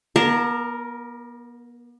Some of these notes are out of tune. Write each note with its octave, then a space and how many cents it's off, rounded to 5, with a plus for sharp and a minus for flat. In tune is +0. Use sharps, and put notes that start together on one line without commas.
B3 -45 A#4 +0 A5 +0